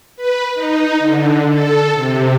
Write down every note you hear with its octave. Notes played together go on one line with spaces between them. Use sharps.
B4
D#4
D3
A4
C3